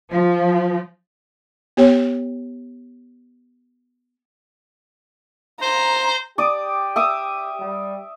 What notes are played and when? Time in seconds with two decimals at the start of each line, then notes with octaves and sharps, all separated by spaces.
0.11 F3
1.77 B3 G4 C#5 G5
5.62 C5 A#5
6.38 G4 D5 D6 D#6
6.96 E5 D6 D#6
7.60 G3